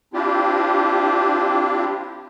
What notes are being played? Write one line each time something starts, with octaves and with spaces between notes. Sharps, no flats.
C4 D4 E4 F4 G4